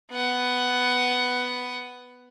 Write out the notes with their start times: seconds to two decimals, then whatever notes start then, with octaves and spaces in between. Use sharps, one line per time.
0.11 B3 F#5